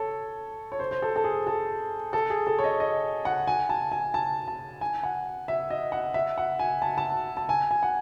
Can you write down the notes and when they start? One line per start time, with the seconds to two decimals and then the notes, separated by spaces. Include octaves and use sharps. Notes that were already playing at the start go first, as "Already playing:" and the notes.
Already playing: A4 C#5
0.72 C#5
0.79 C5
0.91 C5
1.02 A4
1.16 A4
1.24 G#4
1.47 A4
2.13 A4
2.30 G#4
2.47 A4
2.59 C#5
2.64 D#5
2.80 D#5
3.25 F#5
3.47 G#5
3.69 A5
3.92 G#5
4.14 A5
4.48 A5
4.81 G#5
5.03 F#5
5.48 E5
5.70 D#5
5.92 F#5
6.14 E5
6.38 F#5
6.59 G#5
6.82 A5
6.98 A5
7.37 A5
7.49 G#5
7.71 G#5
7.83 F#5